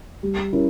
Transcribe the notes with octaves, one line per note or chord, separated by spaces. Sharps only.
G3
C#4 E4 A#4